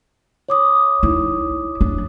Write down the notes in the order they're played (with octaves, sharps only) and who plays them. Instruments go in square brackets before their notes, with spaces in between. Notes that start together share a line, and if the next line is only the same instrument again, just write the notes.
[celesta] C#5 D6 D#6
[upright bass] D#4 E4
D4